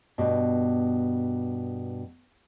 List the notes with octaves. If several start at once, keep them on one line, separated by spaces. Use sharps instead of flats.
G2 B2